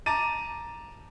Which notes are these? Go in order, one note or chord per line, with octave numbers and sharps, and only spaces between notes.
A5 A#5 D6 A6 D#7